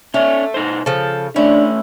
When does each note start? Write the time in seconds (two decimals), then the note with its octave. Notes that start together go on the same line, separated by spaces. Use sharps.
0.14 A3 C#4 C#5 D5
0.54 B2 D#4 C5
0.86 C#3 F3 A4
1.36 A3 C#4 D4 E4